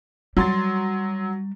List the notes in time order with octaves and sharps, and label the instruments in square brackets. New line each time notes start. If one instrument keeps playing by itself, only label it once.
[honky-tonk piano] F#3 C6 A6 [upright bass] G3